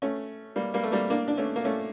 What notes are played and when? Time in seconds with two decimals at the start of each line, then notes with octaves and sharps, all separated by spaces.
0.02 A3 C#4
0.56 G3 A#3
0.74 G3 A#3
0.84 A3
0.92 G3 A#3
1.10 A#3 D4
1.28 D4
1.37 A3 C#4
1.56 A#3
1.64 A3 C#4